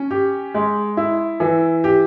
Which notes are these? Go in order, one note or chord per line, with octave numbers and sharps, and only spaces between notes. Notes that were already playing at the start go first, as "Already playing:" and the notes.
Already playing: C#4
G4
G#3
E4
E3
G4